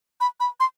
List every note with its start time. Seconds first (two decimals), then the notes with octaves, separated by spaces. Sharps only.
0.21 B5
0.40 B5
0.60 C6